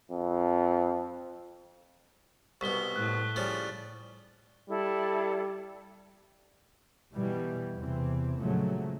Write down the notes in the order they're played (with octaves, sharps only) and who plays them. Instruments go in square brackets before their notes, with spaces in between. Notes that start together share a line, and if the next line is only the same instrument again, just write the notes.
[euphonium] F2
[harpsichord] C2 B2 [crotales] C#6 B6 G7
[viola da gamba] A2 A3 [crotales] F#6
[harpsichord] C#3 F3 G3
[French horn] G3 [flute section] E4 A4
[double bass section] B2 E3 G3
E2 C3 E3 C4
A#2 C#3 F3 F#3 G#3 A3